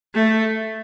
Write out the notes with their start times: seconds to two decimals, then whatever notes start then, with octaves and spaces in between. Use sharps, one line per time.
0.15 A3